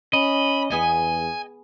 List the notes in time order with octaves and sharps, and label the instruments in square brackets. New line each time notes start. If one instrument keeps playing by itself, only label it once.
[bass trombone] C#4 [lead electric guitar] D#5 [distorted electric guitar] B5
[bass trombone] E2 [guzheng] B3 G#4 [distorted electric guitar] G#5